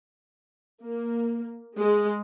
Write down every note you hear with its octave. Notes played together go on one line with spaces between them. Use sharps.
A#3
G#3